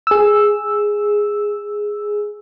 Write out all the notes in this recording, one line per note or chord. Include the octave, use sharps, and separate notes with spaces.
G#4 E6